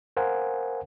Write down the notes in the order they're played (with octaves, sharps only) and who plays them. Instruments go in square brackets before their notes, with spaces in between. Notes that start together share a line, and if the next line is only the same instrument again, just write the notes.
[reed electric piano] A#4 C5 F5 F#5 G#5